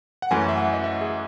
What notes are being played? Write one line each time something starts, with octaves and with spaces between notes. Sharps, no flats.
F#5
F#2 E3 A3 C#4 G#5
E5
F#5
D#5
E5
G#4